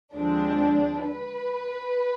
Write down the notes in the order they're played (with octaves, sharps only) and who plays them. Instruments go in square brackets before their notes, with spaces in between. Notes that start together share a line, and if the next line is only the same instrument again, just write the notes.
[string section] D#2 D3 F3 G#3 C4 D4
B4